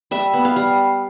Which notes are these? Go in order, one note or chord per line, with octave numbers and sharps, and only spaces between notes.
G3 E5
B3
F5
G3